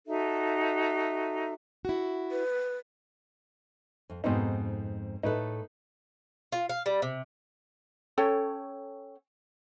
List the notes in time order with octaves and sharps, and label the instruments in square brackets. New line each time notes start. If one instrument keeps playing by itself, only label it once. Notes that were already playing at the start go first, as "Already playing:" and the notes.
[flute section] D#4 F#4 A4 E5
[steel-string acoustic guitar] E4 F#4
[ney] B4
[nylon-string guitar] F2
[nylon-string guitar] F2 G#2 [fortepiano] B2 C4 D#4
[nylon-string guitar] A2 A4 [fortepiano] D#4 B4
[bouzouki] F4
F5
G3
C3
[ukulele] C#4 A4 C#5 G5